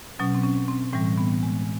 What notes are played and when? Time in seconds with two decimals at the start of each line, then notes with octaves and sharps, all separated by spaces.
0.19 B2 F#3 C#4
0.35 C4
0.44 C#4
0.68 C4
0.93 A2 E3 G3 C4
1.18 B3
1.43 G#3